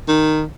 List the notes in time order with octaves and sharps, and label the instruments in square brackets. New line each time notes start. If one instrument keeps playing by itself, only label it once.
[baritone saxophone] D#3